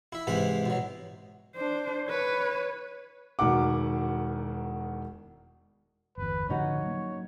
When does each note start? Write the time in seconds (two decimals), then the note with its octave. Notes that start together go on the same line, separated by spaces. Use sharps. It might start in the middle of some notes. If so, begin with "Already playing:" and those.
0.12 E4 E5
0.27 G#2 C3 E3 E4 B5
0.66 B2 F#3
1.56 D4 C5
2.09 B4 C#5
3.39 E1 B2 D#3 A#4 F#5 D6
6.18 G1 E2 B4
6.49 A2 D3 F3 C#4 D#4 F#4 C#5
6.82 F#3 A#3